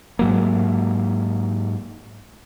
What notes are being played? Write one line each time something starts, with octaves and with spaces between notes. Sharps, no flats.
G#2 F#3 A#3